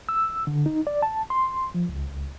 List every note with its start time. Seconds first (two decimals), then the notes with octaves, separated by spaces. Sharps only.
0.09 E6
0.47 D3
0.66 D#4
0.87 D5
1.02 A5
1.30 C6
1.74 F3
1.89 C#2